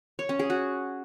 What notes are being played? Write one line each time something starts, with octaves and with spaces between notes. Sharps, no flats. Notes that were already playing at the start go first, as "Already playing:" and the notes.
C#5
C#4
G#4
F#4